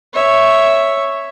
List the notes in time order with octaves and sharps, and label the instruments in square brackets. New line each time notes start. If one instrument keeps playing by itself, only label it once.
[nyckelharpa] C#5 E5